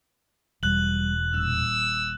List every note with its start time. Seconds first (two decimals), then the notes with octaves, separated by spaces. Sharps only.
0.63 E1 G3 F#6 F#7
1.34 D#1 E6